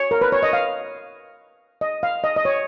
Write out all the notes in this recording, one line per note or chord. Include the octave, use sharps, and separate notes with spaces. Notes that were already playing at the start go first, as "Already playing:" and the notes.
Already playing: C#5
A#4
B4
C#5
D#5
F5
D#5
F5
D#5
D#5
C#5